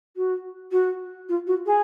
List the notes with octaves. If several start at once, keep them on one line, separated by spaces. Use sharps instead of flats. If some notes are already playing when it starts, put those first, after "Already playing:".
F#4
F#4
F4
F#4
G#4